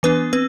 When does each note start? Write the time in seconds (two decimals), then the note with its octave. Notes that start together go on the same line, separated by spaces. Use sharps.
0.03 E3 B3 D4 B4
0.33 C4 B4